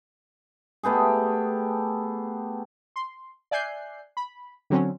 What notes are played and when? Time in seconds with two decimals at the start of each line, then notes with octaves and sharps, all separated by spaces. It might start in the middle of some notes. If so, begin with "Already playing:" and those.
0.83 A3 B3 G4 G#4
2.96 C6
3.51 D5 E5 G#5 F#6 G6 C7
4.17 B5
4.70 D3 F#3 C4 C#4